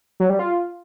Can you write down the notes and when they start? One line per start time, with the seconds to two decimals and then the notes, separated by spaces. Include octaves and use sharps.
0.20 F#3
0.30 G3
0.39 F4